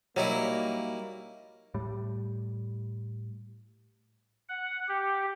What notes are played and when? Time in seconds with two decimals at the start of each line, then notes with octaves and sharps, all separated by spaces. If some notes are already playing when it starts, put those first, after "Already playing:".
0.16 F#3 G3 A#3 D#4 E4
1.74 A2 G3
4.49 F#5
4.88 G4